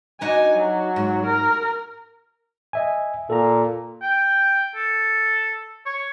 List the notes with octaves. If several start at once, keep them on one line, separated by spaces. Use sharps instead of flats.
D4 D#4 F#4 G#5
F#3
G#2
A#4
D#5 E5 G#5
A#2 A4 A#5
G5
A4
C#5